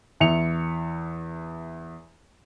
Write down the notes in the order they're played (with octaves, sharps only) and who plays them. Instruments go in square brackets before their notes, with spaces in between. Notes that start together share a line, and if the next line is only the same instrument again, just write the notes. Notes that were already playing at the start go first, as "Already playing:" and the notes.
[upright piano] E2 E5 C#7 F7